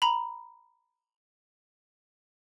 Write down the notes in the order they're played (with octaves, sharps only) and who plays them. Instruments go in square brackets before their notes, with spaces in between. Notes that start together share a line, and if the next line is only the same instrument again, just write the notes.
[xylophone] A#5 B5